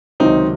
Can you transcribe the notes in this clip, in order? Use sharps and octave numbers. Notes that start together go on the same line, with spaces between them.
C#2 C3 D#3 F#3 C4 D#4